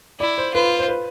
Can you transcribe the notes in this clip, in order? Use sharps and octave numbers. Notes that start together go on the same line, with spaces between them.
E4 D5
C5
F4 B4
C5
B4